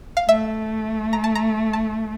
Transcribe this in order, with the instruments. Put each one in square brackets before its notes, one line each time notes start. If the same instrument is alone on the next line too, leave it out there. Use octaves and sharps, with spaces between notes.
[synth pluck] F5
[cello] A3 [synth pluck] E5
[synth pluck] A#5
A5
A#5
A5